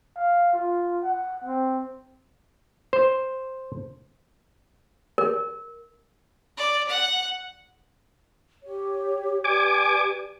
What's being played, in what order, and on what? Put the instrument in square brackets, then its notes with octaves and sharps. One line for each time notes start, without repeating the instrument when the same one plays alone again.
[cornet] F5
F4
F#5
C4
[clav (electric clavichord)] C5
[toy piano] A#4
[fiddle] D5
F#5
[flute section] G4 C#5
[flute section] G4 B4 D5 [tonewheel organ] G#5 D6